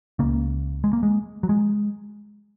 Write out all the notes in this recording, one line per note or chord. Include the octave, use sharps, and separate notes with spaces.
C#2 C#3 A#3
G#3
A#3
G#3
F#3
G#3